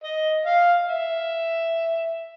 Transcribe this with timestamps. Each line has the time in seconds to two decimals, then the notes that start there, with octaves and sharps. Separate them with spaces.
0.04 D#5
0.46 F5
0.87 E5